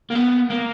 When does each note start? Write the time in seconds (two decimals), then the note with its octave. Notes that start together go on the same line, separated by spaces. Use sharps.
0.10 A#3
0.15 B3
0.50 A#3